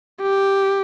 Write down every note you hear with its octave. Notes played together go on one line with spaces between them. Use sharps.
G4